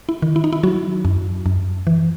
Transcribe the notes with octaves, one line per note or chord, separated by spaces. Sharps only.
E4
D#3
E4
D#4
E4
F#3 F#4
F#2
F#2
E3